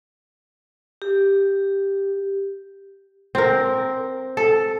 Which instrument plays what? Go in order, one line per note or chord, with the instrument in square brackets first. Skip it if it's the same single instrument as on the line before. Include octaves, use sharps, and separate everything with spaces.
[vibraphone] G4
[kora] C4 A#4
A4